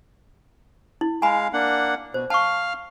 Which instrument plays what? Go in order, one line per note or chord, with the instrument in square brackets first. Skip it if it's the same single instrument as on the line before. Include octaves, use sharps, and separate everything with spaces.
[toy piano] E4
[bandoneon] G#3 F5 [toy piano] G#5 A#5 B5
[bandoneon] A#3 D4 F#5
[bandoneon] B2 [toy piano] C5
[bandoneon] F5 F6 [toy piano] A5 C#6